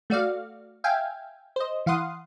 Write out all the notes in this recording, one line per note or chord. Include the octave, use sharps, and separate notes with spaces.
A3 F#4 D5 F5
E5 F5 G5 G#5
C5 D#5
E3 F5 F#5 C6 D#6